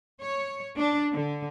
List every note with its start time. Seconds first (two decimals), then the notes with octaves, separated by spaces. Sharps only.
0.22 C#5
0.76 D4
1.13 D3